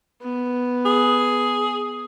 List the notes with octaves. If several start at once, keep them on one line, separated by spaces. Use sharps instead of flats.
B3
G#4